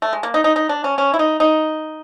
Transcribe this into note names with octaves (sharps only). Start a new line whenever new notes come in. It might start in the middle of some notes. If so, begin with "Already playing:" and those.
A3
G#3
A#3
D#4
D#4
D#4
D4
C#4
C#4
E4
D#4
D#4